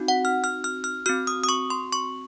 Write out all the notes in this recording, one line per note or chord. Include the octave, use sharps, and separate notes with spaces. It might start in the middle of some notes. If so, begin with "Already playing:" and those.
Already playing: C4 D#4 F#4
F#5
F6
F6
F6
F6
C4 F#4 F6
D#6
D#6
C#6
C6
C#6